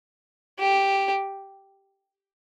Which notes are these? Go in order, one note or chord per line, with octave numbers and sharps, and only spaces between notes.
G4